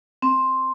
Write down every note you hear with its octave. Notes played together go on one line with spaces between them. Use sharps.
C4